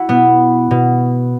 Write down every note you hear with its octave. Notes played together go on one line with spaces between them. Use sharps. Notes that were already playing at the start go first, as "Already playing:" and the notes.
Already playing: E4 F#4
B2 B3
B2